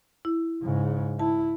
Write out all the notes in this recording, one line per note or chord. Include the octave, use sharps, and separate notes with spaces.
E4
G#2 C#3
E4 A5